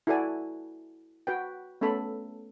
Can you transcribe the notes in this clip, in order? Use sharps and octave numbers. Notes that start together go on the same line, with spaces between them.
E4 F#4 A4 B4 D5 G#5
F#4 B4 G5
A3 B3 C#4 A4 B5